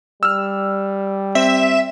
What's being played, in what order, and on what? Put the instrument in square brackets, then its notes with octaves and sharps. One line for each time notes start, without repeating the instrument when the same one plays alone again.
[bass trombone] G3 [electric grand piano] E6 F6
[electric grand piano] C4 [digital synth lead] E5